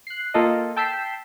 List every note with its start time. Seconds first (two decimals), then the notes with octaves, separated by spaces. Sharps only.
0.07 F#6 C7
0.34 A#3 F4 A4 D#5
0.76 G5 A5 E6 G6 B6 C7